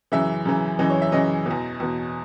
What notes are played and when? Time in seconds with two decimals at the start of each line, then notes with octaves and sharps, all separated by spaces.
0.12 F#2 C#3 E3 E5
0.45 F#2 C#3 E3
0.79 F#2 C#3 E3 D#5
0.90 C#5
1.02 E5
1.12 F#2 C#3 E3 D#5
1.46 E2 B2
1.80 E2 B2